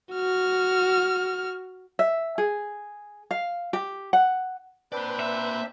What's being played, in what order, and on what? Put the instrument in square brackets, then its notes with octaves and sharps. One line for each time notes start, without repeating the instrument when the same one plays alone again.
[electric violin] F#4 F6
[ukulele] E5
G#4
F5
G4
F#5
[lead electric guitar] A#3 D5 [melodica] C4 D4 C5 [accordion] B4
[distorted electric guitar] E5